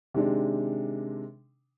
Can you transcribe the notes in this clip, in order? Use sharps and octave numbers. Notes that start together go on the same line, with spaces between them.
C3 D#3 G#3 D4